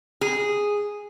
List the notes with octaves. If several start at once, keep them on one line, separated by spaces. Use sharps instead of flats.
G#4